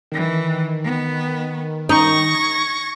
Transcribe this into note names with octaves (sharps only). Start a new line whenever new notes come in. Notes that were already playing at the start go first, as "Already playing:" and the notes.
D#3 E3
B3
D#4 C#6 A#6
G#6